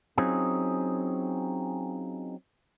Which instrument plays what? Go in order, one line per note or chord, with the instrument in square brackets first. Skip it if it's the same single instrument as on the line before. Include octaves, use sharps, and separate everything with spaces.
[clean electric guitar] F#3 C4 C#4 D#4 F4 G#4